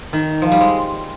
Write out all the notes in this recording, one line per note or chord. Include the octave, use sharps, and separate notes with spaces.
D#3
F3
G3
G#3